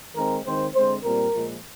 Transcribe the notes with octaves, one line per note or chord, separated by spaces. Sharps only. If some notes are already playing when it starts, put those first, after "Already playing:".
D#3 G#3 C4 A#4
D#3 G#3 C4 C5
D3 G#3 C4 C5
A#2 G3 C4 A#4
A#2 F3 G#3